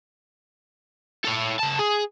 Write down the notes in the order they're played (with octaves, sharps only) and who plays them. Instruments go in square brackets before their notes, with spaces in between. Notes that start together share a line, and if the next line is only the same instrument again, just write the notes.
[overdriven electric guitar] A4 C#5
C#3 A5
G#4